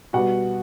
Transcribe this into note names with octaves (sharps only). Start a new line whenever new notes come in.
B2 G3 B3 F#4 F#5